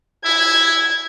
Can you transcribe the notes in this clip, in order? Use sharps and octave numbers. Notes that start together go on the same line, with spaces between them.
E4 G#6